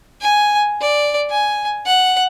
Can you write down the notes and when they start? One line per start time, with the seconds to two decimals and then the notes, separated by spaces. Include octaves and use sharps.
0.21 G#5
0.81 D5
1.30 G#5
1.86 F#5